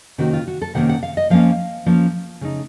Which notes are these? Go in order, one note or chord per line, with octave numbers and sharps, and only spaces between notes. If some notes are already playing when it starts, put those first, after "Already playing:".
C3 D#3 A#3 C#4 F#4
F4
F#4
A4
C3 D#3 A#3 C#4 F#5
F#5
F5
D#5
F3 A#3 C#4 F5
F3 A#3 C#4
C#3 A3 D#4